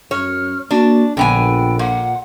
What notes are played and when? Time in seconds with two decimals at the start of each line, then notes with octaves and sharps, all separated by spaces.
0.11 F#2 C#4 C#5 F6
0.71 A#3 D4 F#4
1.17 A#1 D3 B3 G5 G#5
1.79 A#2 F#5